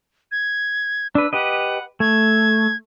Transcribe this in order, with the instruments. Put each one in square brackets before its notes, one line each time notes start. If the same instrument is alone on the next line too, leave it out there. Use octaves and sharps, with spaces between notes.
[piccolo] G#6
[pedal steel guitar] D4 B4 [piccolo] E6
[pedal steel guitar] G4 B4 D#5 [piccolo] F#5
[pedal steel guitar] A3 [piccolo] G#6